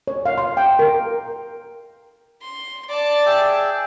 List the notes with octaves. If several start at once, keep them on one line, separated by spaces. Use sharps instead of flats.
C#5
F5
C6
G5
A#4
C6
D5 A5
G#4 E5 G5